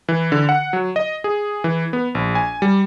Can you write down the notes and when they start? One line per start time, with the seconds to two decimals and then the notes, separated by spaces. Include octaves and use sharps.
0.09 E3
0.32 D3
0.49 F#5
0.73 F#3
0.96 D#5
1.24 G#4
1.64 E3
1.93 B3
2.15 A#1
2.35 G#5
2.62 G3